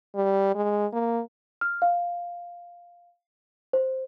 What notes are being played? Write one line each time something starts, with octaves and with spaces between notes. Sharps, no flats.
G3
G#3
A#3
F6
F5
C5